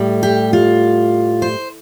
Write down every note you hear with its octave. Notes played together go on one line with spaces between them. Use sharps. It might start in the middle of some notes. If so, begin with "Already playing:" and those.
Already playing: A2 G3
G4
F4
C5